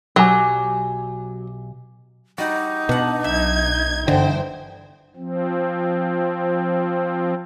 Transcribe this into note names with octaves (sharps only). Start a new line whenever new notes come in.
B1 F#3 G4 G#5
G3 D#4 F#4 D5
B2 D4 F#5
B1 E5 G#6
G1 D3 E3 C5 G5
F3 C4